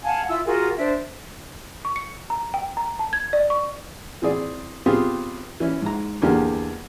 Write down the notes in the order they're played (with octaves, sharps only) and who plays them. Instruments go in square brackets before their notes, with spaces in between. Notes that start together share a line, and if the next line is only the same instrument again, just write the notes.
[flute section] F5 F#5 G#5 A5
E4 F4 E6
F4 F#4 G#4 A#4
D4 C5 E5
[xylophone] C#6
C#7
A#5
G5
A#5
A5
G#6
D5
C#6
[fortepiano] E3 C4 G#4 D5
B3 C4 F4 G4 G#4
E3 C#4 E4
G#2 A#5
E2 D3 A#3 G4